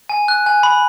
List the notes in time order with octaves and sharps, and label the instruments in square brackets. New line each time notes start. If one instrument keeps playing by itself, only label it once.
[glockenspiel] G#5
F#6
G#5
B5